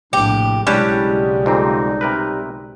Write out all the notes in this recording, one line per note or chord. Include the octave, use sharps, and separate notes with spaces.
A#1 A2 C3 D4 G4
B1 C#3 G3 G#3 C#4 D4 E4 B4
F2 A#2 C4 D#4
C3 A#4 B4